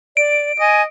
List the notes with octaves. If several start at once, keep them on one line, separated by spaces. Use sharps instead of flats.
D5 D7
D#5 G#5